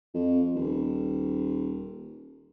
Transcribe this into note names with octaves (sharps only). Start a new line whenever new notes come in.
F2
D#1